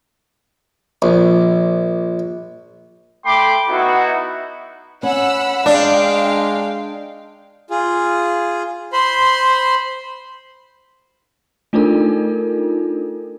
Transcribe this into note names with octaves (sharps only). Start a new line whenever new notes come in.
A#1
A3 G5 B5 C6 D6
B3 D#4 E4 F#4
C#4 F#5 B5 E6
G#3 D4 D5 F5 G5
F4 G#4
C5 B5 C6
A3 D4 D#4 F4 A4 A#4